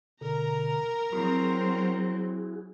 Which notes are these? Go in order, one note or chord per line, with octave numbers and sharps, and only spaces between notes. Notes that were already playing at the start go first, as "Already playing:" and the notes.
B2 D3 A#4 A#5
F#3 C4 E4 F#4 G#4